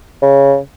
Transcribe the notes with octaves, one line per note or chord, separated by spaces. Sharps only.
C#3